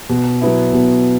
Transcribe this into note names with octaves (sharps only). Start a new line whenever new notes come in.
B2
F#3 B3 E4
B2